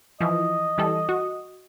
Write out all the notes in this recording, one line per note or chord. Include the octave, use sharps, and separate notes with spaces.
E3 F3 D#5
E3 G3 A4
F#4